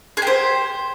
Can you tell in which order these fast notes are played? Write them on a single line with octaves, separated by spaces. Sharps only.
G#4 G4 C5